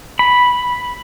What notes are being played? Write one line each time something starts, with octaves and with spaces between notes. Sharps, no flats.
B5